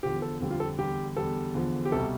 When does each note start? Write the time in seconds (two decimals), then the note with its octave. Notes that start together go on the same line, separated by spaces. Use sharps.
0.03 E2 D3 F3 G4
0.22 A4
0.40 F2 D3 G3
0.50 F4
0.60 A4
0.78 E2 D3 G3 G4
1.16 E2 D3 G3 A4
1.54 E2 D3 F3
1.85 G4
1.92 C2 B2 G3 A4